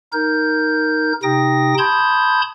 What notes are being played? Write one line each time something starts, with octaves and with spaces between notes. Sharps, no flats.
D#4 A#4 G6
C3 D#4 G5 D#6 A#6
A5 B5 C6 D#6 G6 G#6